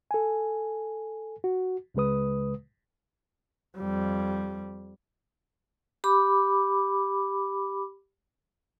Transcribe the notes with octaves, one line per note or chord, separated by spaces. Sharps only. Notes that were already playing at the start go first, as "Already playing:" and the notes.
A4 G#5
F#4
C#2 C#3 G#3 B4 D#6
F2 G3
G4 B5 D6